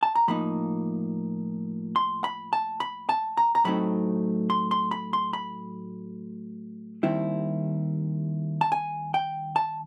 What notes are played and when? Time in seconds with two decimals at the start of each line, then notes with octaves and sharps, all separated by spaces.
0.03 A5
0.15 A#5
0.28 A2 F3 A#3 D#4 B5
1.96 C6
2.24 B5
2.53 A5
2.80 B5
3.09 A5
3.37 A#5
3.55 A#5
3.64 A2 F#3 A3 C4 D#4 B5
4.50 C6
4.71 C6
4.91 B5
5.13 C6
5.33 B5
7.03 D#2 D#3 G3 C4 E4
8.61 A5
8.72 G#5
9.14 G5
9.56 A5